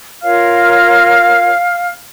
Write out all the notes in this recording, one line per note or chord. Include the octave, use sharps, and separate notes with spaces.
F4 A#4 C#5 F5 F6